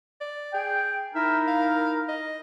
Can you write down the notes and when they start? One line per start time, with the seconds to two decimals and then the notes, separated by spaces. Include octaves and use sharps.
0.20 D5
0.54 G#4 G5
1.15 D#4 E4 A#4 E5
1.47 F5
2.08 D#5